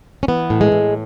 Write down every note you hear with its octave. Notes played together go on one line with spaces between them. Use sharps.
C#4
E3 B3
A2
G#3
A2